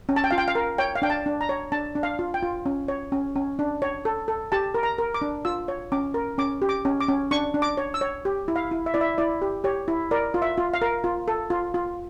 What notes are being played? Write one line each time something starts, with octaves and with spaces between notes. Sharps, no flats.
C#4
A5
G5
F4 F5
G5
F5
A#4
C#5 G5
F5
D4 G5
A5
D4
A#5
C#5
D4 A5
D4
F5
F4
G5
F4
C#4
C#5
C#4
C#4
D4
C#5
A4
A4
G4 A5
A#4
A#5
A#4
D6
D4
F4 E6
C#5
C#4 D6
A#4
C#4 D6
G4
D6
C#4
D6
C#4
D4 C#6
D4
D6
C#5
E6
C#5
G4
E4
F5
E4
E5
E4 D5
E5
E4 D5
G4
G4 C#5
E4
A#4 D5
F4
E5
F4
F5
A#4
F4
A4
F4
F4